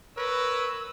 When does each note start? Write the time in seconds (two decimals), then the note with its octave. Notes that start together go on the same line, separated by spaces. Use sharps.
0.17 A#4 B4 C#5 E6